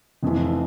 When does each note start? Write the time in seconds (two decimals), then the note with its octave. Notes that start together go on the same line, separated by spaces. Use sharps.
0.23 F1 F2 E3